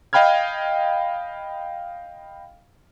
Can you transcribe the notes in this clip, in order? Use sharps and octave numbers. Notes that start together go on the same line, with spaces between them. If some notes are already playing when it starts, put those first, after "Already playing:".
D#5 F5 G5 B5 F6 G#6